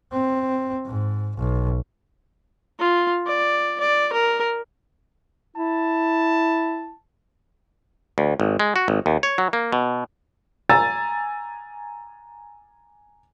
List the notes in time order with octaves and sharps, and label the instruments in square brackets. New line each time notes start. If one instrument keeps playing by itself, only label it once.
[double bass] C4
G#2
B1
[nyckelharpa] F4
D5
D5
A#4
[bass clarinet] E4 [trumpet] A5
[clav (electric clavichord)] D2
G#1
G#3
F#4
G#1
D#2
C#5
F#3
A#3
B2
[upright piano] G#5 A#5 E6 A6